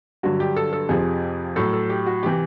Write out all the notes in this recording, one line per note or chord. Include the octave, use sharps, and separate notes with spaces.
G2 D3 F#3 F#4
G4
A4
A4
F2 C3 F3 G#4
A2 F#3 A4
A4
G4
F#4
C3 E3 G4